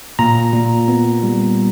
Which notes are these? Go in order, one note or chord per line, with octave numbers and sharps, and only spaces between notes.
A#2 A#5
A#2
B3
G3